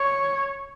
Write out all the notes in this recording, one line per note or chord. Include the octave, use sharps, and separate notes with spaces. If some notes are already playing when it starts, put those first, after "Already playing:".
Already playing: C#5